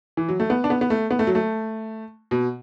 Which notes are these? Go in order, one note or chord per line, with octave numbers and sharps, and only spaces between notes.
E3
F#3
A3
B3
D4
B3
B3
A3
B3
A3
F#3
A3
B2